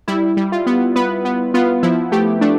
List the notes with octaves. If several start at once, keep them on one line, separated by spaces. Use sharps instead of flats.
G3 E4
G3
F4
B3
B3 B4
B3
B3 F4
F3 E4
A3 G4
A3 D4